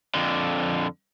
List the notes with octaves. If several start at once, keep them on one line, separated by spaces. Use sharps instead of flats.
F2 D3